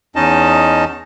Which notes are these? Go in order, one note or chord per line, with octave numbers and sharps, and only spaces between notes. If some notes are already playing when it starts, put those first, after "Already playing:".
E2 C#4 D#4 D#5 A5